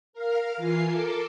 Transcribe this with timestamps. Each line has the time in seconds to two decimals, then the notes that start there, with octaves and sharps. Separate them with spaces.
0.13 A#4 F5 F6
0.57 E3 F4 G#5 C7
0.87 A4 A#4 D6